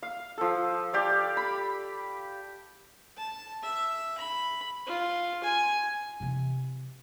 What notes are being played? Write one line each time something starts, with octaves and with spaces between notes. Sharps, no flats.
F5
F3 A4
G4 D5 F5
B5
A5
E5
B5
F4
G#5
C3 E3